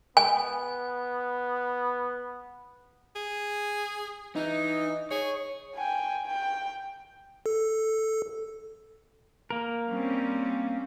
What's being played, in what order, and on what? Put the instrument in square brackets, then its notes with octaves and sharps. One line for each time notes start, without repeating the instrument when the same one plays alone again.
[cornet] B3 [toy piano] G#5
[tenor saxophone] G#4
[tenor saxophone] E3 [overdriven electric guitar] D#4
[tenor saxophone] G#4 [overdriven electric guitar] C#5
[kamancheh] G5 G#5
G5
[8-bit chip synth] A4
[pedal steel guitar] A#3 A#4
[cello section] G3 C4 C#4